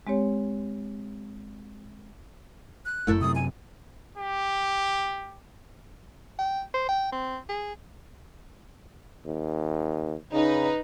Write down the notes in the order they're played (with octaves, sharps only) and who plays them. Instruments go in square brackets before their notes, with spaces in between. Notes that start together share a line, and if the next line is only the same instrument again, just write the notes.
[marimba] G#3 C4 G4 C#5
[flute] F#6
[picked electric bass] F#1 F#2 [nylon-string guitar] A3 E4 A4
[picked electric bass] F#2 C3 [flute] D#6
[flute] G#5
[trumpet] G4
[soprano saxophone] G5
C5
G5
C4
G#4
[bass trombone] D#2
[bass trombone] C#3 [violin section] D#4 B4